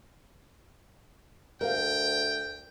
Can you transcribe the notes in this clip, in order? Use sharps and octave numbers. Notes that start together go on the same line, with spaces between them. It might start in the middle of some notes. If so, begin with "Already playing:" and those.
D2 A#4 F5 G5